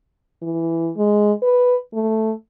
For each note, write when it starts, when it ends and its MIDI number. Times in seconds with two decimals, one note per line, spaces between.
0.42 0.91 52
0.97 1.33 56
1.42 1.76 71
1.94 2.33 57